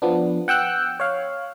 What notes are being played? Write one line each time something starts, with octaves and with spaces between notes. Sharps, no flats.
F3 B3 D4
F#5 G5 E6 F#6
C#5 F5